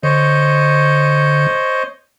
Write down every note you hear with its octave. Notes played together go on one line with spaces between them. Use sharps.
D3 C5 C#5 D#5